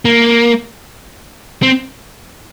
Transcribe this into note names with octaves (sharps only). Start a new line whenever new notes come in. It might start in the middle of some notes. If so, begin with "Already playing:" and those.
A#3
C4